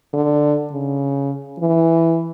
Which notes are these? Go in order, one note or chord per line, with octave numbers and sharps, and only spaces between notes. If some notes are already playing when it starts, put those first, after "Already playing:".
D3
C#3
E3